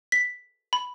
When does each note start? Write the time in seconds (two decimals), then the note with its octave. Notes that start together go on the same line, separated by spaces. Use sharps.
0.12 B6
0.73 B5